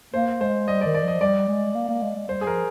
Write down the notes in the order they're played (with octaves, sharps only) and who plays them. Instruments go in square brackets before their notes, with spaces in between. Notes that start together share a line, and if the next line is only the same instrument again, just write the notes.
[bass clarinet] A#3 [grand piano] C5
[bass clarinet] G#3 [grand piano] C5
[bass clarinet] G3 [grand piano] D#5
[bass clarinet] D#3 [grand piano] D5
[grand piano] D5
[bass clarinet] F3 [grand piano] D#5
[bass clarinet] G3 [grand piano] D5
[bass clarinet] G#3
A#3
A#3
G#3
G#3
[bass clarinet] G3 [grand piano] C5
[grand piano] G#4
[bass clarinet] F3 [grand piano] A#4